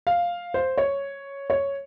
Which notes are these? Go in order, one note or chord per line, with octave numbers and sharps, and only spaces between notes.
F5
C5
C#5
C#5